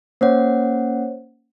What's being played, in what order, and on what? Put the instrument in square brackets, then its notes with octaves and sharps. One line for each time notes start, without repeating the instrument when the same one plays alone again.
[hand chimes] A#3 C#4 F#5 [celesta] C5 C#5